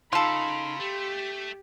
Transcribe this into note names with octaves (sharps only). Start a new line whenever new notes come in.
C#3 D#4 F4 A4 B5 C6
A3 G4